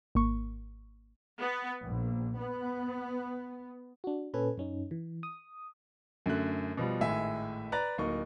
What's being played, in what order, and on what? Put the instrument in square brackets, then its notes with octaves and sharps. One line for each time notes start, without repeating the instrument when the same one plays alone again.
[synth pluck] G#1 A#3 C#6
[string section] B3
A#1
B3
[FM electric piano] D4 F#4
A#2 C#4 A4 B4 G#5
F#2 C#4 D#4
E3
D#6
[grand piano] F#2 D3 A3 F#6
B2 F3 G3
G#1 A2 G#3 E5 G#5
B4 D5 A#5 F#6 A6
D1 A#3 D#4 C#6